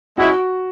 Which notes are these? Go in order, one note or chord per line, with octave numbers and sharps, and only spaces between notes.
G#3 C#4 E4 F#4